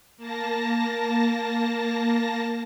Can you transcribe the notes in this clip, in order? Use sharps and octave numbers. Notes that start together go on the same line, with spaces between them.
A#3 A5 A#6